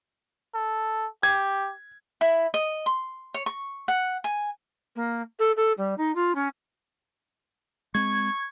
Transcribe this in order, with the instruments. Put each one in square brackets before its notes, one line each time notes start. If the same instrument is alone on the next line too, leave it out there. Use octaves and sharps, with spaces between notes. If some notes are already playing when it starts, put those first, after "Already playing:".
[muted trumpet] A4
[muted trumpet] G4 [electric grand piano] G#6
[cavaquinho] E4
D#5
C6
C#5
C#6
F#5
G#5
[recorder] A#3
A4
A4
G3
D#4
F4
C#4
[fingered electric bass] G#3 C4 [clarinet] C#6 [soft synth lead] G#6